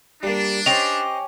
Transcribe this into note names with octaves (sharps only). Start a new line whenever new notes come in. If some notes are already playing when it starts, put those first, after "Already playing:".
G3 A#3 D4
C#4 G4 C5 D#5 F7